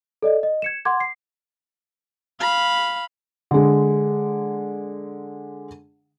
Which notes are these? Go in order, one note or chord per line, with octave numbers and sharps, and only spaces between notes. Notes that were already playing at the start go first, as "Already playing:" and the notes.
A4 D5 D#5
D#5
G#6 C#7 E7
F#5 C6 D6 G#6
C7
F5 B5
D3 G#3